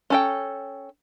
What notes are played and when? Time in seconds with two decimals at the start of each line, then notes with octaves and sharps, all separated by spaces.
0.10 C#4 A4 G5